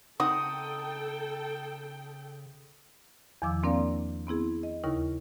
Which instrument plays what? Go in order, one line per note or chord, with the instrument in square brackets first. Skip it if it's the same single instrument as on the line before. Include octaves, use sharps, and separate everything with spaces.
[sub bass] C#3 [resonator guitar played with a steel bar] C4 D#4 F#5 [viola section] A4 G5 [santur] D#6
[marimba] E2 D#3 F3 D6 E6
A#3 C4 D4 A#4 D5 F5
B3 C4 E4 G#4
D#5
D#2 C#3 D#4 E4 A#4 C#6